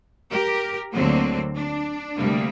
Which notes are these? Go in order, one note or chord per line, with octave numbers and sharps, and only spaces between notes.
G4 A#4
D2 D3 F#3 A#3 C4
D4
D2 C3 G3 A#3